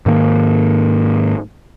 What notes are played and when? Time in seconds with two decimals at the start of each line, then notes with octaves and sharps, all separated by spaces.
0.06 G#2 D#3 A#3